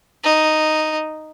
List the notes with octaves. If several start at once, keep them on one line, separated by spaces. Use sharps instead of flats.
D#4